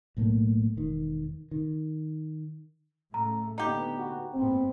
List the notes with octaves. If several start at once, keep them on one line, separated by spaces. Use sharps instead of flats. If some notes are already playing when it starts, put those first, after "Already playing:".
B1 A2 A3 A#3
E1 D#3
D#3
A2 C#3 A3 A#5
D3 B3 D#4 G4 A#5
F#4
F#1 G#2 B3 C4